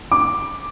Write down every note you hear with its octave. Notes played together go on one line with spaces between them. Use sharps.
D6